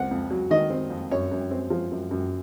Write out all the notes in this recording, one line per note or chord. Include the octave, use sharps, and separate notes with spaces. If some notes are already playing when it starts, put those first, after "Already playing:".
Already playing: C#2 C4 F#5
F2
F#3
D#3 D#5
C4
F2
F#2 C#5
F#2
C4
F3
F#2
F#2